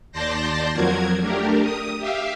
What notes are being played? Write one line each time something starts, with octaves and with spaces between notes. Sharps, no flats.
D#2 D5 A5 C6 G6 A#6
F2 F3 F#3 F#4 A#4 G#6
A3 D4 G4 A#4
D#6
G4 E5 F5